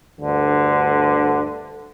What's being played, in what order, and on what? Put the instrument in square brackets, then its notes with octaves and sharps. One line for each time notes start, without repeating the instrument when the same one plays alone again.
[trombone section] D2 G2 D3